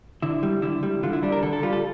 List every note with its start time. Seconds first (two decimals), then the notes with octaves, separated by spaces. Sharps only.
0.22 D3 E4
0.43 G3
0.62 D3 E4
0.83 G3
1.03 D3 F4
1.13 E4
1.23 G3 D4
1.32 A#4
1.42 D3 A4
1.53 A4
1.63 G3 F4
1.73 A4